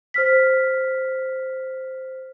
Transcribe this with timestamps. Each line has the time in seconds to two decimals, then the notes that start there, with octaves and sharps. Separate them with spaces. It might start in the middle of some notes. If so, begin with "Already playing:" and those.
0.14 C5 F6 B6